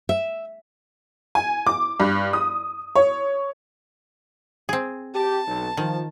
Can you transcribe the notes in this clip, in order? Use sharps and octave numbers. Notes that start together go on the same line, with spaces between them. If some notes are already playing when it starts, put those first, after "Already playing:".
E5
G#5
D6
G2
D#6
C#5
C4 G#4
G4 A5
B1
D#3 F3